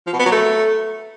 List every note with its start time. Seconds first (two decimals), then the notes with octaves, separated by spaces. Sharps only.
0.07 F3
0.13 B2
0.19 B3
0.25 F#3
0.32 A3